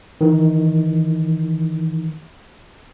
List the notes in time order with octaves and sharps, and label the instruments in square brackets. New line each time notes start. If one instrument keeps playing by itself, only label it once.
[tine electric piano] D#3 E3